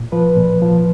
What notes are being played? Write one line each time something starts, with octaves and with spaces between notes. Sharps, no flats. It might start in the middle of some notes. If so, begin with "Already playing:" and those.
Already playing: A#2
F3 B4
A#2
F3